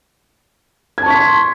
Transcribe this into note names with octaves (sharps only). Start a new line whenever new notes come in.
A5 C6 C#6 G#6 B6